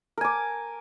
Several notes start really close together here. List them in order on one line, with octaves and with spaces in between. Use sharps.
A#4 G#5 D6